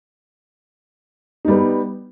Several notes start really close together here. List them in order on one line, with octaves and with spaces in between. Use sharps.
D#4 G3 B3